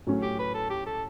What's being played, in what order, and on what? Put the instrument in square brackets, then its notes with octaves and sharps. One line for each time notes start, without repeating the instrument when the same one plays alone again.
[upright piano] A2 F#3 C#4
[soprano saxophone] G4
B4
A4
G4
A4